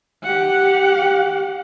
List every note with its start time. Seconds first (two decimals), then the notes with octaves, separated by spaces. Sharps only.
0.23 G4 F#5